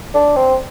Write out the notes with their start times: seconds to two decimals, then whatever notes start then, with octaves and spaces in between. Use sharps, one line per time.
0.14 D4
0.36 C4